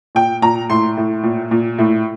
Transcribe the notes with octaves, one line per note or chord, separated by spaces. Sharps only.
A#2 G5
A#2 A#5
A2 C6
A2
A#2
A#2
A2